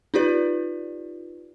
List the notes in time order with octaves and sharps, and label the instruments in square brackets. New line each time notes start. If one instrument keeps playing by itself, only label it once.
[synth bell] D#4 F4 G4 B4 D5